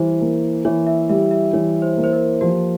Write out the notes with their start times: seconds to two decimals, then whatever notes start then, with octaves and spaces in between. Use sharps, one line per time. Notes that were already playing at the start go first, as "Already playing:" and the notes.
Already playing: E3 G3 C5
0.21 A#3
0.65 E3 C#5
0.87 E5
1.09 G3 E5
1.31 E5
1.53 E3 C#5
1.82 C5
1.97 A#3
2.04 C5
2.13 A#4
2.41 F3 G4